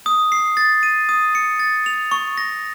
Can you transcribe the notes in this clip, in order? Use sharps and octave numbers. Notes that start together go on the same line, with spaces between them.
D#6
C7
A6
D#7
D#6
C#7
A6
F7
C#6
A#6